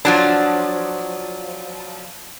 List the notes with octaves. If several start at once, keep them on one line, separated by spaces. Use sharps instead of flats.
F3 F#3 D4